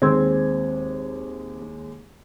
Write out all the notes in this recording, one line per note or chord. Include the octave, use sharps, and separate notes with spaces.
D#2 G#3 C4 G#6